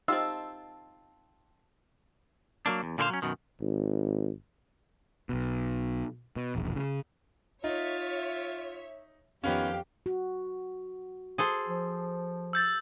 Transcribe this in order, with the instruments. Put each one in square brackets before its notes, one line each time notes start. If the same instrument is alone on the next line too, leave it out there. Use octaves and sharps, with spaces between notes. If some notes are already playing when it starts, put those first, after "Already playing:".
[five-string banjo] C4 F4 [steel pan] D#4 G4 D#5 [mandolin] A5 E6
[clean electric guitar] F#3 A#3 D4
E2
A#2 D3 A#3 G#4 C5 F5
F#3 C#4
F#2 B2 D#3
[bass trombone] G#1
[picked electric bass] B1 B2
B2
E1 A#1
C#3
[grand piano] D#4 [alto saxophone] F4 [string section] C#5 E5
[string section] F2 G4 [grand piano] D#3 B3 C#4 [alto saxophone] F5
[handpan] F#4
[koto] G#4 A4 C5
[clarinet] F3
[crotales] E6 G6 A6